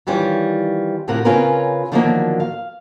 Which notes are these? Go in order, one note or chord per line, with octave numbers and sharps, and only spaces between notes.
D#3 E3 G3 C#4 F4
D2 A2 C3 F4 A#4 F#5
C#3 C4 C#4 F4 A#4 B4
D3 D#3 F3 F#3 A3 A#3
F5